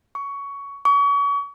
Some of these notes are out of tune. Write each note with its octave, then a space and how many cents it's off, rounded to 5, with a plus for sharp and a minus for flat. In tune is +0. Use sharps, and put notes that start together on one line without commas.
C#6 +15
C#6 +35